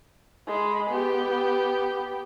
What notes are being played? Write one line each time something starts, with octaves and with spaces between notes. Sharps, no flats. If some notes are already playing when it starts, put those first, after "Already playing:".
G#3 B5
B3 G4